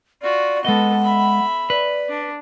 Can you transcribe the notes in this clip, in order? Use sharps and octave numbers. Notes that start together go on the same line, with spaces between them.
F4 F#4 D5
G#3 B3 A4 D#5 F#5
E5 B5
B4 D5
D4